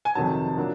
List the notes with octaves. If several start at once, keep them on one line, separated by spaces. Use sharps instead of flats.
G#5
F2 C3 D#3 F#3 A5
A#2 F#3 A#3 D4